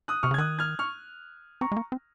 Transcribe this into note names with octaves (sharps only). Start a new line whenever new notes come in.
D#6 F#6
C3 C#6 F6
C#3
G#6
D#3 D#6 F#6
F6 G#6
C#6 F6
C4 A#5 C#6
G#3
A#3
C4